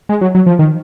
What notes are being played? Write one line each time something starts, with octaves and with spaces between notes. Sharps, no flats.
G#3
F#3
F#3
F3
D#3